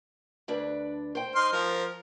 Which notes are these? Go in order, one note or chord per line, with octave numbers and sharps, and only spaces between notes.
D2 D4 B4
C5 G5
D#4 C6 F6
F3 A#4